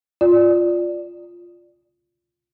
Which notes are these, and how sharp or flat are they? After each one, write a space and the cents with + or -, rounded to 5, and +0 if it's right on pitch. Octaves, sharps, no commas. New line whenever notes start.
F4 +0 D5 +0